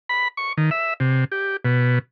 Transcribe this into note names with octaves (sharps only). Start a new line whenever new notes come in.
B5
C#6
D#3
E5
C3
G4
B2